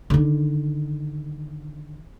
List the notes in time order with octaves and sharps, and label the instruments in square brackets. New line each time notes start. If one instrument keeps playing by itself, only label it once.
[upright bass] D3 D#3